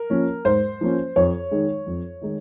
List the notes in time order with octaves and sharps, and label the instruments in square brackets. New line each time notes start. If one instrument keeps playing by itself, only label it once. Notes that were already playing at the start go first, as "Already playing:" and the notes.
Already playing: [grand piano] A#4
F3 A#3 C#4
G#2 C5
F3 A#3 C#4
F2 C#5
D#3 G#3 D#4
F2
D#3 G#3 D#4